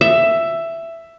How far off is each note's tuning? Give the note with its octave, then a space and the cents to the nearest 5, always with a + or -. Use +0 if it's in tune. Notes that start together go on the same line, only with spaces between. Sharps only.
E5 +10